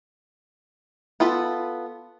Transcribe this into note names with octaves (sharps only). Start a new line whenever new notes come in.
B3 F4 A4 B5